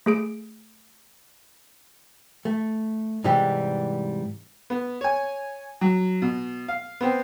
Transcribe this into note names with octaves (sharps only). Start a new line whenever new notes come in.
A3 G#4 D7
A3
G#2 C3 E3 G3 G4
B3
C#5 G#5
F#3
B2
F5
B3 C4